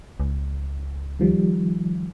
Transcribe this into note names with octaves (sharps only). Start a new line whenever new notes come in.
C#2
D#3 F3 G3